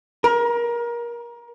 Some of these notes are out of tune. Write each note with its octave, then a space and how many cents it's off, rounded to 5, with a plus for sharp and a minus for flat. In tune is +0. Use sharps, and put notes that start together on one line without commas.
A#4 +25